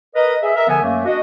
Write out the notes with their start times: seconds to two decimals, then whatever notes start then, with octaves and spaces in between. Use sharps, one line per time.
0.15 A#4 B4 D#5
0.43 G#4 E5
0.55 A#4 E5
0.68 D3 F3 B3 A#4 E5 G#5
0.82 F#2 F#3 A3 A#3
1.05 D4 F#4 D#5